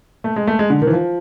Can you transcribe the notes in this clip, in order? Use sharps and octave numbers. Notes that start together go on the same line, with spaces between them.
A3
G#3
A3
G#3
D3
D#3
E3
F3